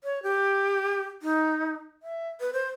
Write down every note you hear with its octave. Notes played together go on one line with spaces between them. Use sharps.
C#5
G4
D#4
E5
B4
C5